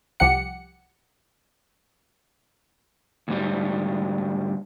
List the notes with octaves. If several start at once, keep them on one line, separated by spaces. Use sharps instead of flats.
C2 F3 G4 F#5 C#7
D2 G#2 G3